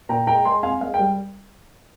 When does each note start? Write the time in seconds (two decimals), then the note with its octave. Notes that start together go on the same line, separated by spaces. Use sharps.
0.09 A#2 G5 A#5
0.27 G#3 G5 A#5
0.45 G#3 G#5 C6
0.63 C4 F5 G#5
0.81 G#3 F5
0.94 G5
0.99 G3